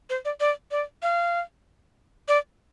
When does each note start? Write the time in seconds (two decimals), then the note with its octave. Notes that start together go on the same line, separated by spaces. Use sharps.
0.10 C5
0.25 D5
0.40 D5
0.71 D5
1.03 F5
2.28 D5